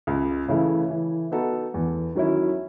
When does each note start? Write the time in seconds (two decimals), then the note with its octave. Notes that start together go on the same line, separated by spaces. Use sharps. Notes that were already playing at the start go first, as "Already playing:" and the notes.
0.07 C#2
0.48 C#3 E3 A3 E4
0.90 E3
1.32 B3 D#4 F#4 A4
1.74 E2
2.15 D#3 F#3 C#4 E4